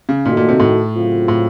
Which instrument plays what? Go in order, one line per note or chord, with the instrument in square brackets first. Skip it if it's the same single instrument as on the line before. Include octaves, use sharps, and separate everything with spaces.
[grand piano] C#3
[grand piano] A#2 [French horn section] D#3 A3 D#4 F#4
[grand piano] A#2
C3
A2
[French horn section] C#3 F#3 C4 F4
[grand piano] A2